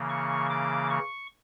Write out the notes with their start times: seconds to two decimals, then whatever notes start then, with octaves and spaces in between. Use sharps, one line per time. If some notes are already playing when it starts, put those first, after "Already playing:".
Already playing: C#3 E3 A#3
0.09 C#6
0.50 D6
0.90 C#6